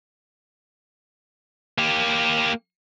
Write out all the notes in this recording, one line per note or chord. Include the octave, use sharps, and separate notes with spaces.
A#3 G4